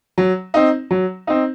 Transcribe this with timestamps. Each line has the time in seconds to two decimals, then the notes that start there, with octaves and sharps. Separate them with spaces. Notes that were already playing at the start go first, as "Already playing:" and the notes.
0.18 F#3
0.54 C4 D#4
0.91 F#3
1.27 C4 D#4